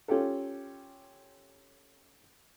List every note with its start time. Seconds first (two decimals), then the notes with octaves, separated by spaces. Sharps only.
0.08 C#4 F4 G4 A4